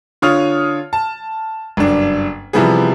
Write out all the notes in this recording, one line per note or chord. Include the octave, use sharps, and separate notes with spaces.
D3 F4 C#5 D#6 F6
A5
F#1 G2 D4
C3 E3 F3 G3 B3 G#4